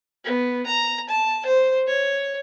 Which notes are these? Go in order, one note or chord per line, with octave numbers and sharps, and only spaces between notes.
B3
A#5
A5
C5
C#5